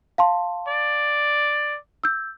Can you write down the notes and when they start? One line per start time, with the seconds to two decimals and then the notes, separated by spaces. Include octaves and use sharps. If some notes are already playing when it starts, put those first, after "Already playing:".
0.18 F5 A5 C6
0.68 D5
2.04 E6 G6